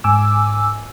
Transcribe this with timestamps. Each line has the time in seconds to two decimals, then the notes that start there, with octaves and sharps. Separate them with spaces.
0.04 G#2 G#5 D6 E6